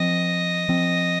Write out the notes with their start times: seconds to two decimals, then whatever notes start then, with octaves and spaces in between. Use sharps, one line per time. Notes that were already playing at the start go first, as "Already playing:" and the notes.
Already playing: F3 C4 D#5
0.69 F3 C4